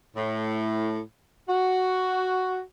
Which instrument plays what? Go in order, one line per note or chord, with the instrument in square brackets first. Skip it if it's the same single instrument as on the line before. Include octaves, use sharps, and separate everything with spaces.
[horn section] A2
F#4